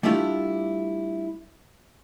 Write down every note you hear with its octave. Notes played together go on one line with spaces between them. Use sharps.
G3 A3 D4 E4 F4 G4